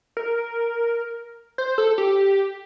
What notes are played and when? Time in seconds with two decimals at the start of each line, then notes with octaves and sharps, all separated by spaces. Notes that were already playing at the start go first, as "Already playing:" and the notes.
0.17 A#4
1.58 C5
1.78 A4
1.98 G4